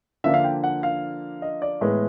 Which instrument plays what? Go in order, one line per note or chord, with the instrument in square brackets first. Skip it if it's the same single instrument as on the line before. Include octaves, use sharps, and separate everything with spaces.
[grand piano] D3 F3 A#3 D4 E5
F5
G5
F#5
F5
D#5
D5
A2 E3 G#3 B3